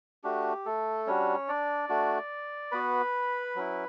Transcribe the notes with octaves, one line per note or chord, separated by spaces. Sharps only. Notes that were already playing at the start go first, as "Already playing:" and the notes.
A3 D4 F#4 G4
A3 A4
G3 C#4 D4 F#4 C#5
D4 D5
A3 D4 F#4
B3 F#4 B4 B5
F#3 C#4 E4